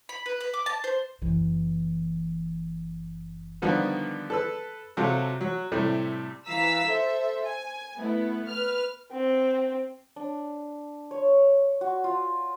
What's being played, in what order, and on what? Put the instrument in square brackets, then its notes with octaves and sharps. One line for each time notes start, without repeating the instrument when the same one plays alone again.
[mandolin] B5
B4
B4
D6
A5
C5
[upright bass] F#1 E3
[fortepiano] D3 D#3 F3 G3 B3
A4 B4 E6
C3 F#3 F4 A4
F#3
A2 C3 G3 A3
[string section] E3 F5 A#5 E6 B6
A4 C5 E5
G#5
A3 B3 E4
B4 F6
[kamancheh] C4
[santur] D4
C#5
F#4
F4